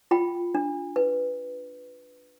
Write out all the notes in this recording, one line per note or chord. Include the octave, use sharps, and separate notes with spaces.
F4 G5 B5
D4
B4